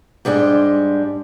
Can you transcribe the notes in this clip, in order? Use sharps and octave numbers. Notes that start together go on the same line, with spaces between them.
G#2 G3 G#3 D4